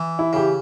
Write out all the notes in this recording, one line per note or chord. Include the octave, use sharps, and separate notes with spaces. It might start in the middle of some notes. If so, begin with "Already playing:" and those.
Already playing: E3
E4
C#3 G4